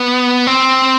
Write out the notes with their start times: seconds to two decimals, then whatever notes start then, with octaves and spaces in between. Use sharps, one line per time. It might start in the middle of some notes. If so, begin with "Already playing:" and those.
Already playing: B3
0.47 C4